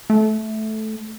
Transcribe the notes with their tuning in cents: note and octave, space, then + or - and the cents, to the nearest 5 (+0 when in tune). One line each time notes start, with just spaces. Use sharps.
A3 -15